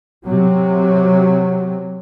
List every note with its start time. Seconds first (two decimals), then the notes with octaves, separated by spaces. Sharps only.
0.24 C3 F#3